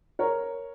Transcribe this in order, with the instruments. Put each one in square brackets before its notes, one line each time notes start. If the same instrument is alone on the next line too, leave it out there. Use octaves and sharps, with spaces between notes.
[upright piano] A#4 C#5